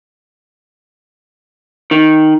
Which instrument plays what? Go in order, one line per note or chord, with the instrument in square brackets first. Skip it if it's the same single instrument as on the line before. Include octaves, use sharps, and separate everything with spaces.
[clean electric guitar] D#3